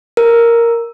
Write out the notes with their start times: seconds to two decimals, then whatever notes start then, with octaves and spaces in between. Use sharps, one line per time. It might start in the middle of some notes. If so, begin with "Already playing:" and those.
0.17 A#4